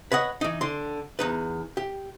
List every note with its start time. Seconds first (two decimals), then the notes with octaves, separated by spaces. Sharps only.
0.12 B4 C#5 D#5 F#5
0.41 E3 D#4
0.61 D3 C6
1.19 E2 D#4 B4
1.77 G4